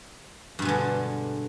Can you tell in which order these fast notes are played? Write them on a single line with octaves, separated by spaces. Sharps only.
G2 B2 G#3 D3